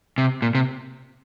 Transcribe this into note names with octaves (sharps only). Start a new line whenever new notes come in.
C3
A#2
C3